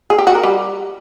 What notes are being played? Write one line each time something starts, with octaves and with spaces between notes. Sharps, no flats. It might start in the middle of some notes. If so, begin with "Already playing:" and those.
G#4
G4
F#4
A#4
G3